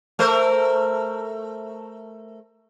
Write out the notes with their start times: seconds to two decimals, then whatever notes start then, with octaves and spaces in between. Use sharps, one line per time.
0.19 A3 A#4 C5